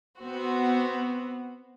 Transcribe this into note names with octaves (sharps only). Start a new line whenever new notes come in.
B3 C4 F#4